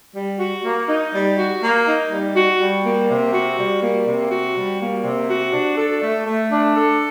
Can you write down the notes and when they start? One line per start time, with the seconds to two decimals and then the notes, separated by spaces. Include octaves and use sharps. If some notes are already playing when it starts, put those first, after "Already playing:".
0.15 G3
0.39 F#4
0.64 A#3
0.88 D#4
1.13 G3
1.37 F#4
1.61 A#3
1.86 D#4
2.10 G3
2.35 F#4
2.58 G3
2.83 A#3
3.09 C3
3.32 F#4
3.57 G3
3.81 A#3
4.06 C3
4.30 F#4
4.55 G3
4.79 A#3
5.03 C3
5.28 F#4
5.53 D4
5.76 A4
6.01 A3
6.26 A3
6.50 D4
6.75 A4